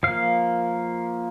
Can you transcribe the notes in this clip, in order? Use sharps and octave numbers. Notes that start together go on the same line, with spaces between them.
F3 A#3 F5